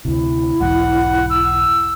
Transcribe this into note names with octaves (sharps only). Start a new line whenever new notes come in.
D2 C3 E4
B1 E2 G#2 F#5
E6